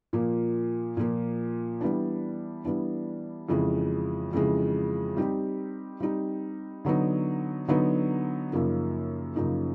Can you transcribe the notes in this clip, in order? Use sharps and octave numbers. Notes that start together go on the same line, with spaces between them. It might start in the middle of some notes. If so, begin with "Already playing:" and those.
A#2 F3 A#3
A#2 F3 A#3
E3 G3 B3 D4
E3 G3 B3 D4
F2 C#3 E3 G#3
F2 C#3 E3 G#3
G3 C4 D#4 G4
G3 C4 D#4 G4
D3 F#3 B3 D#4
D3 F#3 B3 D#4
F#2 C#3 F3 A#3 D#4
F#2 C#3 F3 A#3 D#4